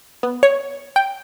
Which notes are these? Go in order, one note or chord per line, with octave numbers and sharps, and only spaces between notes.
B3
C#5
G5